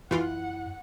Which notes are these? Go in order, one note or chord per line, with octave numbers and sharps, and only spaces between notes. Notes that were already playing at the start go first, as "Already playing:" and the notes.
F#2 E3 E4 F4 F#5